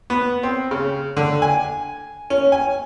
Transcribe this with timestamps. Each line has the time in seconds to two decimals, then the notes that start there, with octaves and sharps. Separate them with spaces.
0.10 B3
0.43 C4
0.71 C#3
1.17 D3
1.42 G#5
2.30 C#4
2.52 G#5